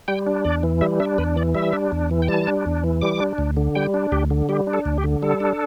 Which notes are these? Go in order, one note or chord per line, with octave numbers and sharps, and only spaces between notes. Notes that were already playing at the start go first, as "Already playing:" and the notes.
G3 G5
D4
E2 D5
E3
G3 E5
D4 E5
E2 B4
E3 D5
G3 E5
D4
E2
E3
G5
G3 A5
D4
E2
E3
G3 D6
D4
D2
D3
G3 G5
D4
D2 G4
D3
G3 G4
D4
A4
D2
G4
D3
G3 A4
D4